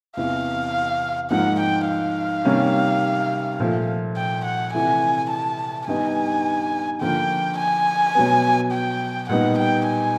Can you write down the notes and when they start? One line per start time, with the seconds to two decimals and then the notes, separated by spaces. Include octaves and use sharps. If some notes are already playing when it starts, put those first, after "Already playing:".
0.17 E2 C3 E3 F5
1.31 G#2 F3 A#3 F#5
1.60 G5
1.88 F5
2.45 C3 D#3 G3 A#3 C#4
3.60 A#2 F3 A3
4.16 G5
4.45 F#5
4.73 C3 E3 A3 G#5
5.30 A5
5.87 G2 D#3 G3 B3 D#4 G#5
7.01 D3 F3 A#3 G5
7.58 G#5
8.15 B2 F#3 B3
8.72 G5
9.29 A#2 G3 B3 D#4 F#5
9.58 G5
9.87 G#5